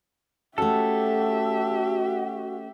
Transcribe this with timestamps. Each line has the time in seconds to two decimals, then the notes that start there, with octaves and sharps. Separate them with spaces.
0.58 A3 C#4 F#4 G4 A4 E5